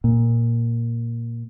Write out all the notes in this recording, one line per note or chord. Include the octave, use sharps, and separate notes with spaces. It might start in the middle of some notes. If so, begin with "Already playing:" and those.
A#2